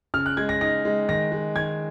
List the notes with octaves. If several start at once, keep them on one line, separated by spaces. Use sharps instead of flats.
C#3 F6
F#6
G#3 G#6
A#6
D#4 A#6
G#3
D#3 A#6
G#3
D#3 G#6